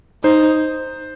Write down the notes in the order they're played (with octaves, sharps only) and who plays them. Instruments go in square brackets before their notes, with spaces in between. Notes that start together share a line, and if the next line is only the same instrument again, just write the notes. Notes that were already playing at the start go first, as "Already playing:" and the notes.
[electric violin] D#4 [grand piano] C5